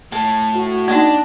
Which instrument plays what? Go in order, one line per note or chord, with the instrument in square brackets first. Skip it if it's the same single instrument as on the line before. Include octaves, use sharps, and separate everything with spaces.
[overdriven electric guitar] A2 [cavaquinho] A5
[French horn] F#4
[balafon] A#3 D#4 [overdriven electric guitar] D4 [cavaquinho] D#5 A5